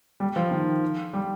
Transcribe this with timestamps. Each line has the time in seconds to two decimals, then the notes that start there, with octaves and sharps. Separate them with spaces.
0.20 G3
0.36 F3
0.51 D#3
1.13 G3